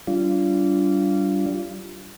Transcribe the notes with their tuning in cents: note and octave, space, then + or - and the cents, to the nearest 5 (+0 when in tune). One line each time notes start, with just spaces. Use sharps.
G3 -25 D4 -25 F4 -20